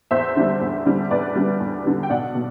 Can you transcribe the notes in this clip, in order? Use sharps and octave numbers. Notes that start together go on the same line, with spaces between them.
E2 C5 E5
D3 G3
E2
D3 G3
E2 B4 D5
D3 G3
E2
D3 G3
G5
B1 D5 F#5
B2